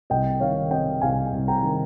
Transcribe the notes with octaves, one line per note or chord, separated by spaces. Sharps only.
C2 D#5 G5
D#3 C#5 F5
C3 D#5 G5
C2 F5 G#5
C2
G5 A#5
D#3